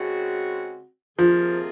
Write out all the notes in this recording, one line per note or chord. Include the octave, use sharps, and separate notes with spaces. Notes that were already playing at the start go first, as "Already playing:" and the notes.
Already playing: C#3 G#3 C4 F#4
C3 D#3 F3 A#3 F4 G#4